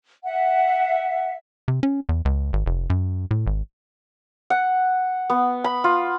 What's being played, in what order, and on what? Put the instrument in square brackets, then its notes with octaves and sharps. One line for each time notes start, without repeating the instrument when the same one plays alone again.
[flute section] E5 F#5
[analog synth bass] C3
C#4
E2
C#2
G#1
F1
F#2
A2
G#1
[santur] F#5
B3
B5
F4